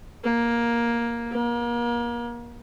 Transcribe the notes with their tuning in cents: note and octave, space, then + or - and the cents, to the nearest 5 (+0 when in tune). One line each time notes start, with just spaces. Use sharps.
A#3 +10
A#3 +35